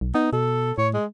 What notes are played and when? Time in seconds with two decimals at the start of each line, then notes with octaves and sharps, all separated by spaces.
0.01 B1
0.14 B3 D#4
0.33 B2 A4
0.78 A2 C#5
0.94 G#3